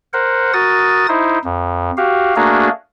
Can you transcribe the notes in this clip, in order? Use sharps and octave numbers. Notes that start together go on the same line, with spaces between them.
A#4 C5 F#5
F#4 A#4 D#6 A6
D#4 E4 C5
F2
F#4 G4 F5
A3 A#3 D4 F#4 G#4 A#4